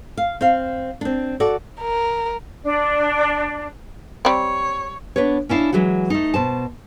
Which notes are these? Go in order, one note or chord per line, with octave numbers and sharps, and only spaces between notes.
F5
C4 F5
C4 D4
F#4 A4 D5
A#4
D4
G3 C4 C#5
B3 D4 B4 C#5
C#4 D4 E4 F5
E3 F#3 G#3 F#4
A3 D#4
B2 C5 A5